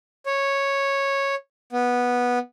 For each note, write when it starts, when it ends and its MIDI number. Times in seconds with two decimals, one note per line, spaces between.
0.26 1.35 73
1.73 2.39 59